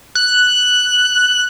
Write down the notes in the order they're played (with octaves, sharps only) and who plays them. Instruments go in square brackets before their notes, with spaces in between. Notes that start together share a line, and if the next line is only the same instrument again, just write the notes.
[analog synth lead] F#6